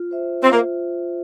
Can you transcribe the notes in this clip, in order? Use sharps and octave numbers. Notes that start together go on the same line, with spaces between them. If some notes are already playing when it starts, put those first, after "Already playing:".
Already playing: F4
C5 E5
C4 F4
A#3